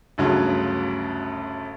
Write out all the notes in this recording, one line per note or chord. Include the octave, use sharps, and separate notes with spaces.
G1 D2 G2 C#3 F#3